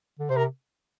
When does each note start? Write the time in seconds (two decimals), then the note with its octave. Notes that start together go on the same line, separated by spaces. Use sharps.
0.20 D3
0.30 C3 C5
0.37 A#4